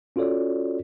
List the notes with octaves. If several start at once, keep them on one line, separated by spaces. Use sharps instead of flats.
C#4 F4 F#4 A4 C#5 D5